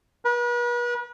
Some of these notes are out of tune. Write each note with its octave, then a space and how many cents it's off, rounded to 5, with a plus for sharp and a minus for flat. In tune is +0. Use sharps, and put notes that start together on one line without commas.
B4 -40